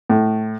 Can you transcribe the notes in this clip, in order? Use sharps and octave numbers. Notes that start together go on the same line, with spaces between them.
A2